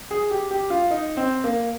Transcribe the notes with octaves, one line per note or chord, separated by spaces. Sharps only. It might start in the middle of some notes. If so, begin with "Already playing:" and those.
G#4
G4
G4
F4
D#4
C4
A#3